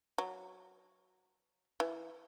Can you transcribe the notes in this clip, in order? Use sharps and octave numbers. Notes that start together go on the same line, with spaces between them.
F#3
E3